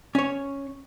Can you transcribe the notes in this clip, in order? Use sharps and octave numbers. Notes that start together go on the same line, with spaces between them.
C#4 C#5